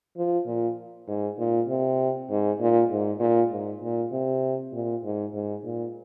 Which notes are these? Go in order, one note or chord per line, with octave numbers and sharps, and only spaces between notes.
F3
A#2
G#2
A#2
C3
G#2
A#2
G#2
A#2
G#2
A#2
C3
A#2
G#2
G#2
A#2